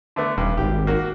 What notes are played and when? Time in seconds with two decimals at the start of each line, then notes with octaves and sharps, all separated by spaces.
0.16 D3 A3 B3
0.38 D#1 G2
0.57 G#1 G4
0.87 A#3 F#4